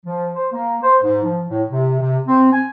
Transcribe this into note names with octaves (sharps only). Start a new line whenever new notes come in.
F3
C5
A#3
C5
G#2
F3
A2
C3
C3
C4
G#5